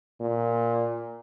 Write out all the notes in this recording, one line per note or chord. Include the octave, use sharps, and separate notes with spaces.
A#2